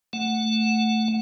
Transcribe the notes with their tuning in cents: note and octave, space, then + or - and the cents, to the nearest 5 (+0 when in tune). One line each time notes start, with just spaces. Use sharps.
A3 +0 F#5 +0